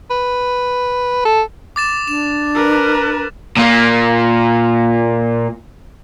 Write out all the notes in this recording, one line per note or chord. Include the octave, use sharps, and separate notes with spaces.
B4
A4
D6 A6 E7
D4 E7
A#4 B4
A#2 A#3